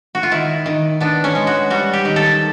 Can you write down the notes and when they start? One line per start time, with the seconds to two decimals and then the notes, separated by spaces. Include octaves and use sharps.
0.15 F#4
0.23 F4
0.31 D#3 E4
0.66 D#3
1.00 B3 D4
1.24 C#4
1.35 G#3
1.47 F#4
1.70 G3 F#4
1.93 G4
2.05 D#3
2.16 A4